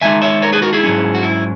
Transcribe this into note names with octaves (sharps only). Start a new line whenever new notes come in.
E2 D#3 G#3 D#4 E5 G#5
C#5 E5
A#4 C#5
G#4 B4
F#4 A#4
E4 G#4
G#2 F#3 C#4
F#4
E4